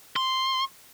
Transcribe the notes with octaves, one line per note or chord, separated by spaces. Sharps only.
C6